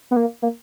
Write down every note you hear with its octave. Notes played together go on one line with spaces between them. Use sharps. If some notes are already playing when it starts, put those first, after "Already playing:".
B3
A#3
A#3